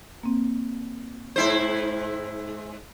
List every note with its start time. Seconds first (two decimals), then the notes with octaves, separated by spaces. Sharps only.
0.23 A#3 C4
1.36 G#2 E4 C5